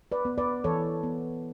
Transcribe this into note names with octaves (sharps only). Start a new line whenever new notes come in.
B4 D5
B3
B4 D5
E3 A4 C#5
B3